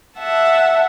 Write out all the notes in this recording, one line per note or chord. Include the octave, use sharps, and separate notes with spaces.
E5 F#5 A5